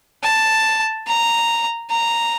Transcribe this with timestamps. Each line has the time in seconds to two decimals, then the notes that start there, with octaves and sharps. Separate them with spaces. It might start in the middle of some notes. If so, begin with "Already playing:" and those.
0.23 A5
1.07 A#5
1.90 A#5